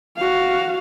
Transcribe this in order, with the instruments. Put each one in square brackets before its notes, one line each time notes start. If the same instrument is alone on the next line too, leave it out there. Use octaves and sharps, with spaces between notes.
[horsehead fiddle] F#4 F5